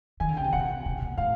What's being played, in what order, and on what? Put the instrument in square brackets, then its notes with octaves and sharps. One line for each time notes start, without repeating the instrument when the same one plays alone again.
[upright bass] D#3 [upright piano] G#5
[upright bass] D3
[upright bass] C#3 [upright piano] G5
[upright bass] C3
[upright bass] B2 [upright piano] F#5
[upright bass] B2
A#2
[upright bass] A2 [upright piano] F5